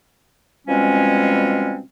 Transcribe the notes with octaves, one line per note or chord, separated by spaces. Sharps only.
B2 F3 G3 G#3 C4 C#4